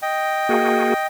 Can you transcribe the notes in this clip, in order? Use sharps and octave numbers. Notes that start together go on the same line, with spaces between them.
D#5 G5
A#3 F#4 G#4